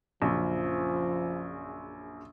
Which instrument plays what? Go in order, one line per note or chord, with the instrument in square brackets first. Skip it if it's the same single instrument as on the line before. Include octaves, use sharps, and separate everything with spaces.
[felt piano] A#1 F#2 C#3 [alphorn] F3